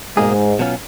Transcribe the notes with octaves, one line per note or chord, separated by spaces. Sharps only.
G#2 B2 G#3 A#3 D#4 G#4
B2 F#3 C#4 F4